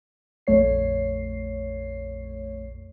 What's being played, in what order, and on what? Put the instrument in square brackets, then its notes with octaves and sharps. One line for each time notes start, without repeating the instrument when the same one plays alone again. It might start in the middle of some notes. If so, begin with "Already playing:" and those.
[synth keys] A#1 F2 A3 C#5 C7